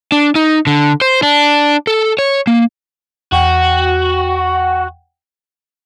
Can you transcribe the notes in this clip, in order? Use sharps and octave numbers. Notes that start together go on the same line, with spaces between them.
D4
D#4
D3
C5
D4
A4
C#5
A#3
E2 F#4 F#5 G5